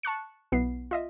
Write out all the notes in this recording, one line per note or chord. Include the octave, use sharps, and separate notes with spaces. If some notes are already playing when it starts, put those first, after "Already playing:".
A5 C#6 F#6 C#7
B1 B3 E4 C7
F4 D#5 E5